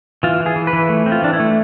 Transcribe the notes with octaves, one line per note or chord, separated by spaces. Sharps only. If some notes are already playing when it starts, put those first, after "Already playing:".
E3 F4
E3
G#4
E3
B4
E3
A3
C4
F4
E3 D4
E4
A3